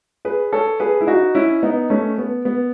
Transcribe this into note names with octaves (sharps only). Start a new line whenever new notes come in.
G#4 B4
A4 C#5
G#4 B4
E4
D#4 F#4
C#4 E4
B3 D#4
A3 C#4
B3
B3